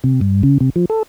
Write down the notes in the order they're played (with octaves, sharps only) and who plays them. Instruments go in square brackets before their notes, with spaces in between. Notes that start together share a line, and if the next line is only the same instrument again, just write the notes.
[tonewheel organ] C3
G2
C#3
C3
F3
A4